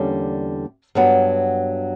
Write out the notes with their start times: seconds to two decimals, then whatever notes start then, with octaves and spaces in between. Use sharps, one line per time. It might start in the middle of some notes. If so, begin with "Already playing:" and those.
Already playing: E2 D3 G3 A#3 C#4
0.95 G2 F#3 B3